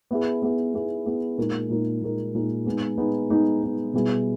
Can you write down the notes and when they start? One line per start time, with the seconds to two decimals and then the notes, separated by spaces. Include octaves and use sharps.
0.11 B3 E4 G#4
0.42 B3 E4 G#4
0.74 B3 E4 G#4
1.06 B3 E4 G#4
1.38 A#2 G#3 D#4 A#4
1.70 A#2 G#3 D#4 A#4
2.02 A#2 G#3 D#4 A#4
2.35 A#2 G#3 D#4 A#4
2.66 G#3 B3 D#4
2.98 G#3 B3 D#4
3.30 G#3 B3 D#4
3.63 G#3 B3 D#4
3.93 B2 G3 B3 E4 G#4